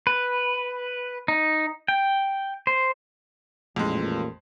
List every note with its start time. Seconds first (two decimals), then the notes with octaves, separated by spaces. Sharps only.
0.07 B4
1.28 D#4
1.88 G5
2.67 C5
3.76 A1 F2 A#2 G#3